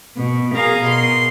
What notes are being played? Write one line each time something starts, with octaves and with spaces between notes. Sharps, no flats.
B2
G#4 A#4 F5 A#5
B2 C6